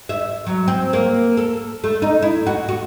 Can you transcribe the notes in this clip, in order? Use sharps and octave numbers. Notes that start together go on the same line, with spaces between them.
E5
F#3
C4
A#3
A4
A3
D#4
E4
F#4
F#4